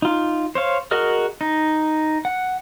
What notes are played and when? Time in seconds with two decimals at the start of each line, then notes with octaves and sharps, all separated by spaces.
0.02 D#4 F4
0.55 C5 C#5 F5
0.91 F#4 G#4 A#4 D#5 F6
1.41 D#4
2.25 F#5